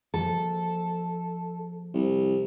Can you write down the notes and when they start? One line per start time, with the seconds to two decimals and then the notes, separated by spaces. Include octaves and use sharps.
0.14 F3 A#3 F#4 A4
1.94 C2